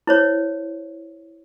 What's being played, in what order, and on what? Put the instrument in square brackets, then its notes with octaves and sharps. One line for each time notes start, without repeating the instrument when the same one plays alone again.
[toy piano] E4 C5 C#5